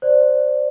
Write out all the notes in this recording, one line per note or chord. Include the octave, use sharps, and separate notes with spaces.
C5 D5